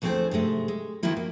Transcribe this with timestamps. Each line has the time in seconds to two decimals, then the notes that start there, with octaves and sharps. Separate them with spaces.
0.02 D2 F3 A3 C4 G#4 C5
0.31 G#2 C3 G#3 A3
0.68 G#3
1.03 D#3 F3 F#3 A#3 E4 A#4
1.17 A#3